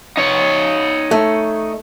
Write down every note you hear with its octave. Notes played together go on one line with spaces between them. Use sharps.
D#4 C#5
A3